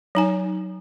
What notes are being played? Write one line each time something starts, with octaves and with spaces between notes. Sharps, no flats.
F#3 D#4 G#5